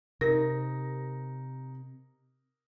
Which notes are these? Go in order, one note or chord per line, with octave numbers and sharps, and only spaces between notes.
C3 D#4 A#4 A#6